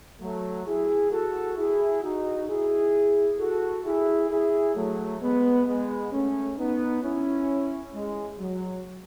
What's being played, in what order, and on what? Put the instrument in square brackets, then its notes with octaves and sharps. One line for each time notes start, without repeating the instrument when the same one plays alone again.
[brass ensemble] F#3 A3
E4 G#4
F#4 A4
E4 G#4
D#4 F#4
E4 G#4
F#4 A4
E4 G#4
E4 G#4
F#3 A3
G#3 B3
G#3 B3
A3 C#4
B3 D#4
C#4 E4
G#3
F#3